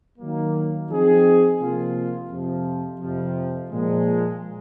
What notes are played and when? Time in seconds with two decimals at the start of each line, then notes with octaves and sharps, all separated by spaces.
0.19 D#3 F#3 A#3
0.90 F3 C4 D#4 G#4
1.60 C3 F3 A#3 F4
2.30 F2 C3 F3
3.01 F2 C3 F3
3.71 A#2 F3 G#3